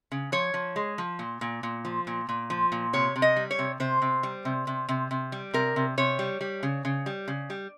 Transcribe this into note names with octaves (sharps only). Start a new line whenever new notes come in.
C#3
F3 C#5
F3
G#3
F3
A#2
A#2
A#2
F3
A#2
A#2
F3
A#2
C3 C#5
C3
D#5
G3
C#5
C3
C3 C5
C3
G3
C3
C3
C3
C3
G3
C3 A#4
C3
C3 C#5
G3
G3
C#3
C#3
G3
C#3
G3